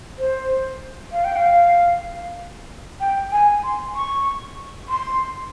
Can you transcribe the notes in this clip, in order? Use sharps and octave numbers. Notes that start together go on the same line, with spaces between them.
C5
F5
G5
F5
G5
G#5
C6
C#6
C6